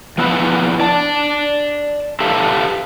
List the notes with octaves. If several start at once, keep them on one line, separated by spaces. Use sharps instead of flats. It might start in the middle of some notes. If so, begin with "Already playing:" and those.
F3 B3 E4 B4
D5 A5
G4 A4 B4 E5 F5 A5